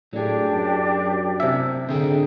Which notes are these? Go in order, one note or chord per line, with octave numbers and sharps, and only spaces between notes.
A2 F#3 D4 G4 G#4 D5
F#2
C3 C#4 E4 E5
D3 C4 G#4 G5